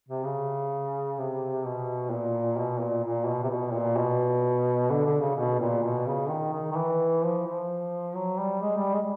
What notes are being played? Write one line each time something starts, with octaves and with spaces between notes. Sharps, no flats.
C3
C#3
C3
B2
A#2
B2
A#2
A#2
B2
C3
B2
A#2
B2
D3
D3
C#3
B2
A#2
B2
C#3
D#3
D#3
D#3
E3
F3
F3
F#3
G3
G#3
G3
G#3